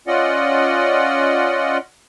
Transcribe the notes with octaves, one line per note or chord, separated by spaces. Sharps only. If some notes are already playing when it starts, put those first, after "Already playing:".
C#4 F4 D5 D#5 F#5